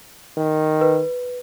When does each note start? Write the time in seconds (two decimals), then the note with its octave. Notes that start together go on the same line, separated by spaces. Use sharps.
0.38 D#3
0.81 B4